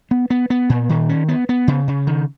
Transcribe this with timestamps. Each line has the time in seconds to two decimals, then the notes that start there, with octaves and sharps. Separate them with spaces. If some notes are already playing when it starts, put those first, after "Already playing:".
0.11 B3
0.30 B3
0.50 B3
0.69 A#2
0.89 D#3
1.09 C#4
1.28 B3
1.49 B3
1.68 C#3
1.88 C#3
2.07 D#3